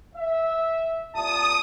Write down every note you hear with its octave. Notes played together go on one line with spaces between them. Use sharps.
E5
C2 A#2 A5 D#6